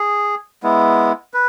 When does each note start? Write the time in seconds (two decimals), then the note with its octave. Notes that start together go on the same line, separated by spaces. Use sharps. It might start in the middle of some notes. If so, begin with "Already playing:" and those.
Already playing: G#4
0.63 G#3 B3 E4
1.34 B4